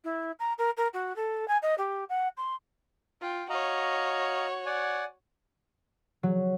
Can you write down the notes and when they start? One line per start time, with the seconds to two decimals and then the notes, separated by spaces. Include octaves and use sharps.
0.04 E4
0.39 A#5
0.58 A#4
0.77 A#4
0.93 F#4
1.16 A4
1.48 G#5
1.62 D#5
1.78 G4
2.09 F#5
2.37 C6
3.21 F4 G5
3.50 F#4 C#5 D#5 F5 A#5
4.66 D5 F#5 G#5
6.23 F#3